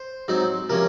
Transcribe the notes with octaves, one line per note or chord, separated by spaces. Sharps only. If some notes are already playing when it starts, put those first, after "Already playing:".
Already playing: C5
G#2 F#3 C4 D#4
C3 F3 A#3 C#4 A#4